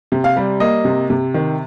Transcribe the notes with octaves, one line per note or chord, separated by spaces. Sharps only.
C3
F5
G3
A#3 D#5
C3
C3
D#3